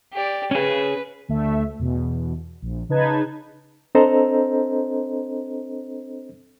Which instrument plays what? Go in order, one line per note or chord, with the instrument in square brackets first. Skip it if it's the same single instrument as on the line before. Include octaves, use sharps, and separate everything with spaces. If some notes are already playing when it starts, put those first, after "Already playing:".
[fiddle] G4 D5
[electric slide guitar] C#4 G#4 [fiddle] B4
[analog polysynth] D2 A3 E5
E2 B2
A#1
C#3 D#4 B4 A5 G#6
[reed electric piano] C4 D4 A4 C5 D#5 A#5